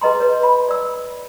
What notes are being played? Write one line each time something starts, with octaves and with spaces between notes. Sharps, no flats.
G#4 B4 D#5 A#5 C6
B4 C#5
B5
D5 E6